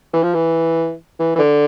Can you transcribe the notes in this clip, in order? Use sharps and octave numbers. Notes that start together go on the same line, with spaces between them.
E3
F3
E3
E3
E3
D3